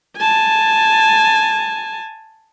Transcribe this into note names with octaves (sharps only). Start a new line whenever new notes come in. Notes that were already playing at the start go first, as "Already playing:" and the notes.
G#5 A5